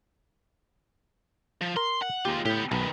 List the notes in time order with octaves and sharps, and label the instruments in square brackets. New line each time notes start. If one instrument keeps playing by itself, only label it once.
[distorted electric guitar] F3
[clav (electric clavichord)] A#4 [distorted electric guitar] C6
[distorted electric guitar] F#5
[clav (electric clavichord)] D#2 G4 [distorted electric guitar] G#3 F4
[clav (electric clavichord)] A2 [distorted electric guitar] B3 G4
[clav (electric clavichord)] B1 [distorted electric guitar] D#3 B3